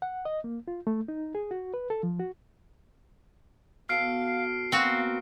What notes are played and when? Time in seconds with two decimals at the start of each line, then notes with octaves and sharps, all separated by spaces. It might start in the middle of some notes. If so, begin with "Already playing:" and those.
0.02 F#5
0.25 D#5
0.44 A#3
0.68 F4
0.87 A3
1.08 D#4
1.35 G#4
1.51 F#4
1.74 B4
1.90 A4
2.03 F3
2.20 F#4
3.89 B2 A4 F5 F6 C7 D7
4.72 B2 A#3 C4 F#4 F5